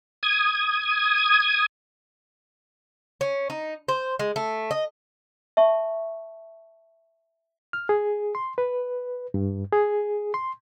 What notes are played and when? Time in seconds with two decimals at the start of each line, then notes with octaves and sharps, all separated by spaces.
0.23 D#6 G#6
3.21 C#4
3.50 D#4
3.88 C5
4.19 G#3
4.36 A3
4.71 D#5
5.57 E5 A5 C#6
7.73 F6
7.89 G#4
8.35 C6
8.58 B4
9.34 G2
9.72 G#4
10.34 C6